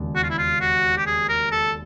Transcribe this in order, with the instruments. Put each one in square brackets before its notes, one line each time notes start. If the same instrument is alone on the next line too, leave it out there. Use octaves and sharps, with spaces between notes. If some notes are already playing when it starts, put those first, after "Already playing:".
Already playing: [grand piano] E1 D#2 C#3
[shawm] F#4
F4
E4
F4
F#4
G4
G#4
A#4
A4